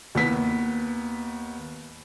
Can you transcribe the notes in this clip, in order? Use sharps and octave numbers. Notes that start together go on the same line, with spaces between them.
D#2 B3 B6